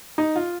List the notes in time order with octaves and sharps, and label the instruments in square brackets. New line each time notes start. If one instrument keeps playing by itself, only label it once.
[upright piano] D#4
F4